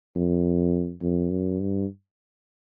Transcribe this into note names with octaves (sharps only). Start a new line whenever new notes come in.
F2
F2
F#2
G2